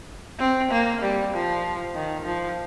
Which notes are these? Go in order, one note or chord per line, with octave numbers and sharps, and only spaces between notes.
C4
A#3
G3
F3
D#3
F3